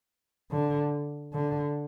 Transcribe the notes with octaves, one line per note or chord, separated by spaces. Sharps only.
D3
D3